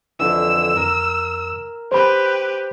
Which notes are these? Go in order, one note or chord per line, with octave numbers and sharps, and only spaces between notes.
F2 D3 E3 E6
F2 A#4
G4 B4 C5 B5